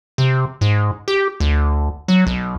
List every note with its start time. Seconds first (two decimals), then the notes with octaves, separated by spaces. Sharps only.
0.18 C3
0.61 G#2
1.08 G4
1.40 D2
2.08 F#3
2.27 B1